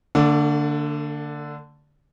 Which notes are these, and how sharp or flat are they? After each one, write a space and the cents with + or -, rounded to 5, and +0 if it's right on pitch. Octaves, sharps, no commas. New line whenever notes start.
D3 +0 A3 +45 D5 +0